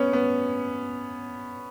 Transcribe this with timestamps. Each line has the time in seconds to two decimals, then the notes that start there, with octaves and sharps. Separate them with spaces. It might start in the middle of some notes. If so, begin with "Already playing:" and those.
Already playing: B3 C#4
0.13 B3